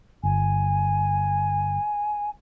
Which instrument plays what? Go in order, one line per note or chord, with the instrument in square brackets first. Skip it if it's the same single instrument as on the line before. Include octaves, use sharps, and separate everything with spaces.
[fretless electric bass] G1 [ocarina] G#5